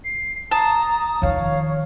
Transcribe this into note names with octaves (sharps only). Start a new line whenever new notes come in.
C7
A5 A#5 D#6
F2 D#3 C#5 F5